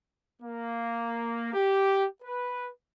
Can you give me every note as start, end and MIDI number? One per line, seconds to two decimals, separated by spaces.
0.42 1.52 58
1.53 2.06 67
2.23 2.69 71